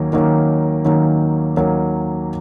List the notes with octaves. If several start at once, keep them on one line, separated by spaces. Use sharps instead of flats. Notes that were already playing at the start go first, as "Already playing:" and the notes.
Already playing: D#2 D#3 F#3 A#3 C#4
D#2 D#3 F#3 A#3 C#4
D#2 D#3 F#3 A#3 C#4
D#2 D#3 F#3 A#3 C#4